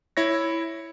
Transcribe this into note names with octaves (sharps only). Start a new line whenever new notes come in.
E4 C#5 A#6